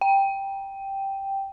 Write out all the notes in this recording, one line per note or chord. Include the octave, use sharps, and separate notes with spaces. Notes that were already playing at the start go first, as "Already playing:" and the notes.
G5